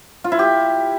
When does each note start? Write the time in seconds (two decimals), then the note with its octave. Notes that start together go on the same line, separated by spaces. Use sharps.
0.24 F4
0.32 E4
0.39 G4